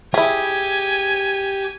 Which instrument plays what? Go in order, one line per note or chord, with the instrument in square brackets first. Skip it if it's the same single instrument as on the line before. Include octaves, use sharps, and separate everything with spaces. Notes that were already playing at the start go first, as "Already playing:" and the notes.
[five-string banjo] E4 G#4 [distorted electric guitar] G4 [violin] G#5